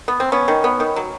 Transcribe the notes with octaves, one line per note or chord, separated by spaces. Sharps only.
B3
C4
B3 C#4
D#3
B3
D#3
F#3